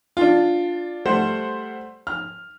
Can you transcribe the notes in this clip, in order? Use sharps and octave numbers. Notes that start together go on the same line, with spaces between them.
D4 F4
G3 A3 C5 F#5
F6